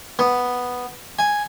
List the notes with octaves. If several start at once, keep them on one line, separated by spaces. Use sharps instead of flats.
B3
G#5